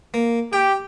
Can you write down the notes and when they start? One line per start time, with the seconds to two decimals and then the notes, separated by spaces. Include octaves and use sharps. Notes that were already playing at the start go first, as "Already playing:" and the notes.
0.14 A#3
0.53 G4 G5